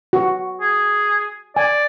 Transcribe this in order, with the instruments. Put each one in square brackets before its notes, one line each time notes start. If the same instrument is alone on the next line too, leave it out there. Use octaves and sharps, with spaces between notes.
[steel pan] F#4
[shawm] G#4
[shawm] D5 [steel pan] G#5